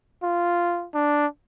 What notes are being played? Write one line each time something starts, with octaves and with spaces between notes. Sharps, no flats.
F4
D4